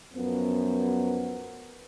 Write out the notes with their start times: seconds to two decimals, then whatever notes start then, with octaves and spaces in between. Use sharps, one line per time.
0.14 F#2 F3 B3